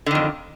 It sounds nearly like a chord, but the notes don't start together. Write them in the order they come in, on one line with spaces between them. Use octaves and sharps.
D3 D#3 F2